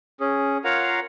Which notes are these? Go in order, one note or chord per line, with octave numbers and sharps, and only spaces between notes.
C#4 G#4
F4 A#4 C#5 F5 F#5 A#5